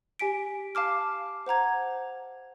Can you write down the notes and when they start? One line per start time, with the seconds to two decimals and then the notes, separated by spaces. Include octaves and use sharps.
0.19 G4 G#5 B6 D7
0.75 F5 A5 D6 F6
1.46 C5 F#5 A#5 G#6